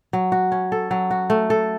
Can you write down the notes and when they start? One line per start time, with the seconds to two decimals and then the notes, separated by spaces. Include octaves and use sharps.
0.13 F#3
0.32 F#4
0.52 C#4
0.72 A4
0.91 F#3
1.11 F#4
1.30 A3
1.50 A4